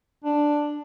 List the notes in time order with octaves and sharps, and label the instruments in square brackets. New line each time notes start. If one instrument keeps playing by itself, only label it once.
[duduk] D4